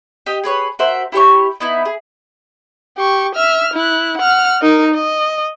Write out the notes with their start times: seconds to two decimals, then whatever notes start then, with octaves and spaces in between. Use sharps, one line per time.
0.26 G4 D#5
0.44 G#4 B4 C#5
0.79 F#4 A#4 C5 E5
1.12 E4 G4 C#5 C#6
1.60 B3 D#4 E4
1.85 G#4
2.98 G4 C#6
3.35 E5 F6
3.74 E4 F#6
4.18 F#5 F6
4.62 D#4 A#4
4.94 D#5